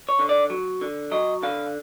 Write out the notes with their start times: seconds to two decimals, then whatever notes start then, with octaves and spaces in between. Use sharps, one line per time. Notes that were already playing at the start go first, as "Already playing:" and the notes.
0.09 C#5
0.19 D3
0.29 D5
0.50 F#3
0.81 D3
1.11 F#3 D#5
1.43 D3 F5